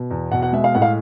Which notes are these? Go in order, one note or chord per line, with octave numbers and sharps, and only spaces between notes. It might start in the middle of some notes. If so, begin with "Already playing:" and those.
Already playing: B2
E2
B2 F#5
F#5
G#3 E5
F5
A2 F#5
F5